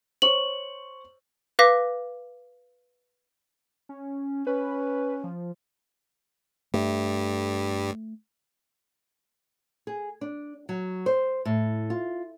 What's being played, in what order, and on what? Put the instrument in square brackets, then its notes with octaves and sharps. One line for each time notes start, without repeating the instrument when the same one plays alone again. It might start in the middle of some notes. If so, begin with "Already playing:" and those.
[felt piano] C5 C#5 C#6 [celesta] F#7
[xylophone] B4 F5 D6 A#6 B6
[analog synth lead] C#4
[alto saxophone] C#4 [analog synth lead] B4
[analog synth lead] F3
[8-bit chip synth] G2 G3 [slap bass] A3
[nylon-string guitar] G#4
D4
F#3
C5
A2
F4